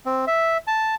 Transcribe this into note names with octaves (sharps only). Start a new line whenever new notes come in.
C4
E5
A5